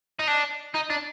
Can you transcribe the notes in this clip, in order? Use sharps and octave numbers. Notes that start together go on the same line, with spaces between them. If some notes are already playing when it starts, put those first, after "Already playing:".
D#4
D4
D#4
D4